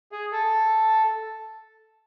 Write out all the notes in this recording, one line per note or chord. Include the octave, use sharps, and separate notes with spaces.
G#4
A4